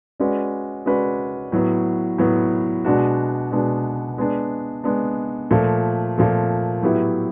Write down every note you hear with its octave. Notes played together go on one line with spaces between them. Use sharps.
G#3 C#4 F#4 B4 D5
G#3 C#4 F#4 B4 D5
A2 F#3 B3
A2 F#3 B3
B2 G#3 B3 D4 F#4
B2 G#3 B3 D4 F#4
G#3 B3 D4
G#3 B3 D4
A#2 F3 A3
A#2 F3 A3
A2 F#3 B3 E4 G4